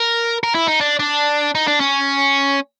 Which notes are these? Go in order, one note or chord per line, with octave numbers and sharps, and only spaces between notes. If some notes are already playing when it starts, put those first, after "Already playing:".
Already playing: A#4
A#4
E4
D#4
D4
D4
D#4
D4
C#4